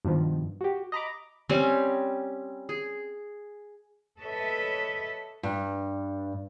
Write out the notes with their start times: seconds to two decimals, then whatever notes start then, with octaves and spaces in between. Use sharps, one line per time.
0.05 G2 B2 D#3 F3
0.61 F#4 G4
0.92 D#5 A#5 B5 D6
1.49 G3 C4 C#4 G#5
2.69 G#4
4.19 A4 B4 C#5 D#5 E5
5.43 G2